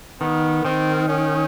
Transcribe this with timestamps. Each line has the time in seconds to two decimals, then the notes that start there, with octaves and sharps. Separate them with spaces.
0.20 D#3 B3
0.65 D#3 C4
1.08 C#4